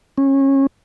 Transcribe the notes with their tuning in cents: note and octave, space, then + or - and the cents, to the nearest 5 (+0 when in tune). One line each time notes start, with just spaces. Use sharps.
C#4 -25